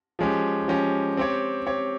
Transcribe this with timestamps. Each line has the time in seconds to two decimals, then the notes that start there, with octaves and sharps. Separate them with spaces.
0.19 F3 G#3 C#4 G4
0.68 F3 G#3 C#4 G4
1.17 C4 G4 C#5
1.66 C4 G4 C#5